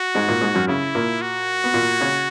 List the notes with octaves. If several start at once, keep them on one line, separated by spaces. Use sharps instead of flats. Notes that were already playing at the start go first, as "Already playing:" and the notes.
Already playing: F#4
G#2 G#3
A#2 A#3
G#2 G#3
F#2 F#3
C#3 E4
A#2 A#3
F#4
B3
A#2 A#3
C#3 C#4